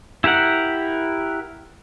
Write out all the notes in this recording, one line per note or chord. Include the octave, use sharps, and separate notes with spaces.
E4 G4 A#4 F#5